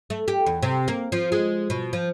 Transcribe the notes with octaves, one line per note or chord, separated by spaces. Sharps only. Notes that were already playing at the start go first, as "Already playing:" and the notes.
A3
G4
E2
C3
A#3
F3
G#3
B2
F3